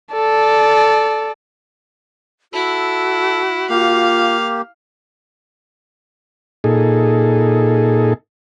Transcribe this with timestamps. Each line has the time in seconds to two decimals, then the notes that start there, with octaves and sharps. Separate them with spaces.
0.13 A4 D5
2.53 E4 F#4 A4
3.70 A#3 F4 G4 F5
6.64 A#2 D#4 G#4 A4